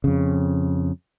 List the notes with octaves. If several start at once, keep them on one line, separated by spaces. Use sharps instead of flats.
F2 C#3